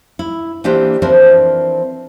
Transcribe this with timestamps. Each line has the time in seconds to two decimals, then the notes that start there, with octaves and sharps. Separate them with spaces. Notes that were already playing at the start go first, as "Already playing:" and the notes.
0.19 E4
0.64 E3 A#3 D4 G4 C5
1.02 E3 F3 C4 D4 A#4 C5